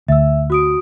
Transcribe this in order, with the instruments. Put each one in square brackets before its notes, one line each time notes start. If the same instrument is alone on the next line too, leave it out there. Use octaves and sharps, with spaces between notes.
[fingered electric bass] D2 [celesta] E5 E6
[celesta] F#4 D#6 D7